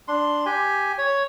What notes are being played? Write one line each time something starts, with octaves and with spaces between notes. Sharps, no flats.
D4 C6
G4 G#5
C#5